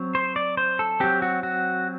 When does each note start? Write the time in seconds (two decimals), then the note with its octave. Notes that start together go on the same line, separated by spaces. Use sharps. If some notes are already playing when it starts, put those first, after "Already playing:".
Already playing: F#3 C4
0.15 C5
0.36 D5
0.57 C5
0.79 A4
1.00 F#3 C4 G4
1.22 F#4
1.43 F#4